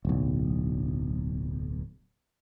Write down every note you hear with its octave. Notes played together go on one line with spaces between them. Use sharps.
D1 B1